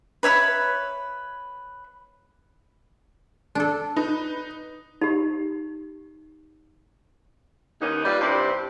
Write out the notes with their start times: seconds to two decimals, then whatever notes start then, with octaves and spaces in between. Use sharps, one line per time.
0.23 B4 C#5 E5 B5
3.55 D4 A4
3.96 D#4 B4
5.01 D#4 G4
7.81 D#2 A#3 B3 C#4 D#4
8.05 G3 F4 B4
8.21 G2 C3 E4 B4 C5 D5